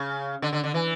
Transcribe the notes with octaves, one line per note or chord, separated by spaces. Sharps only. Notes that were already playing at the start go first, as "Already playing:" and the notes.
Already playing: C#3
D3
D3
D3
E3